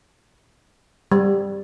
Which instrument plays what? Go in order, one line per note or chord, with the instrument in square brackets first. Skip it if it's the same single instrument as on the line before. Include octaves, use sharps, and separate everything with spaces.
[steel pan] G3